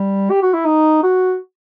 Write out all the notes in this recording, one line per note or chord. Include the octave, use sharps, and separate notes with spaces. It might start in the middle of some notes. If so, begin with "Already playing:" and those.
Already playing: G3
G4
F#4
E4
D#4
F#4